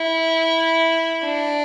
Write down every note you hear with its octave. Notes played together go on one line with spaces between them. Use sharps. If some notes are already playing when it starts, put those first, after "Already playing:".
Already playing: E4
D4